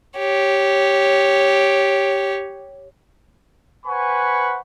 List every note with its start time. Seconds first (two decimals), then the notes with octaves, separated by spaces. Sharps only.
0.19 G4 C#5
3.86 B4 C5 F#5 G#5 B5 C#6